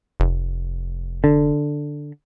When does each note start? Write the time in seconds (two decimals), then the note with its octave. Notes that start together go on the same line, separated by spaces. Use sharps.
0.20 F1
1.24 D3